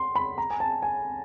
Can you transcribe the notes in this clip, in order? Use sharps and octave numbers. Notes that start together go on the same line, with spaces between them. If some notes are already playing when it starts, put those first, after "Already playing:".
Already playing: C6
B5
A#5
G#5
A5
G#5